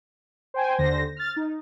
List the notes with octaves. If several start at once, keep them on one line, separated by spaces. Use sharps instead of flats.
C5 G5 G#5
D#2 D3 C5 A#6
F6 A6
D#4